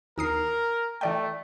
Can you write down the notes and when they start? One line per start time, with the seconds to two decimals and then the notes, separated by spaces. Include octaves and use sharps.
0.18 D#2 A#4 D#6 C7
1.01 E3 A3 D5 G5